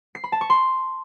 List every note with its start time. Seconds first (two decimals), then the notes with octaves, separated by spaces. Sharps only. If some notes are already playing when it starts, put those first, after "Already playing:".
0.15 C7
0.24 B5
0.32 A5
0.41 C#6
0.50 C6